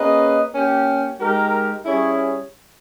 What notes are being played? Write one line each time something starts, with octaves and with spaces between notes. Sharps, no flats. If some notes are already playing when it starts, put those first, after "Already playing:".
Already playing: A#3 C#4 G#4 B4 D#5
A#3 C#4 G4
G#3 D#4 G4 A#4
G3 C#4 E4 G#4 C#5